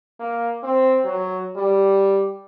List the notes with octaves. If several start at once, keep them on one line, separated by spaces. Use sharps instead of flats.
A#3
C4
F#3
G3